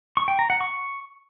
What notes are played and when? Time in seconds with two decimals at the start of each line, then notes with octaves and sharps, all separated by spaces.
0.17 C#6
0.28 G5
0.39 A#5
0.50 F#5
0.61 C#6